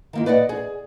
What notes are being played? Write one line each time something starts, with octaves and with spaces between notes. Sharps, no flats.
D#3 A#3 F4
B4 D5 D#5 F#5
G#4